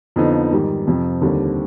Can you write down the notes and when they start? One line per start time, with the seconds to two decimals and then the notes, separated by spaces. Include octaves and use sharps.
0.16 F2 D3 F3 B3 D#4
0.52 G#2 D#3 G3
0.87 F2 C3 F3
1.21 D#2 D3 G3 C4